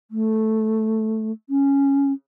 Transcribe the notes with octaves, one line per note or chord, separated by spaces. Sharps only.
A3
C#4